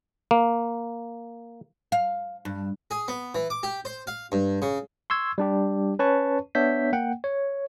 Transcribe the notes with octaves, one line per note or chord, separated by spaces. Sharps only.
A#3
F5
G2
G#4
B3
E3
D6
G4
C5
F5
G2
C#3
C6 C#6 E6 G#6
G3 D4 G4
C#4 B4 C#5 A5 C#6
B3 D4 C#5 E5 G6 B6
A#3 F#5 G5
C#5